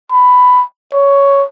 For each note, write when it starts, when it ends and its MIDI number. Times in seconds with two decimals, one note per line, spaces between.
0.11 0.63 83
0.93 1.44 73